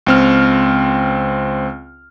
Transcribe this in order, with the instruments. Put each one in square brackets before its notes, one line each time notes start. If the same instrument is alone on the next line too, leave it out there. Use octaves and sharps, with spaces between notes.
[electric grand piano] C#2 C4 F6